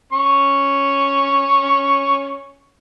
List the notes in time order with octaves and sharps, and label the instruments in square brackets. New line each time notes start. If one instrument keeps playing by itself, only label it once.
[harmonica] C#4 C#6